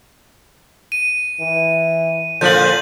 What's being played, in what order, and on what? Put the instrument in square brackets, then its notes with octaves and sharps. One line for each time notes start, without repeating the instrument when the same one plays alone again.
[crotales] D#7
[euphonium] E3
[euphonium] A#2 [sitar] D3 F3 [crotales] G6 F#7